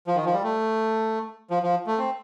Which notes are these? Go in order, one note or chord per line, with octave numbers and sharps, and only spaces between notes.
F3
D#3
F3
G3
A3
F3
F3
A3
C4